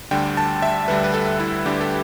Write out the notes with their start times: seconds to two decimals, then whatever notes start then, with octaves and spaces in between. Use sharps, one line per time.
0.11 D2 D3 G3 D4 G5
0.37 A5
0.62 E5
0.88 D2 D3 G3 D4 B4
1.04 B4
1.14 A4
1.40 E4
1.65 D2 D3 G3 D4 G4
1.81 A4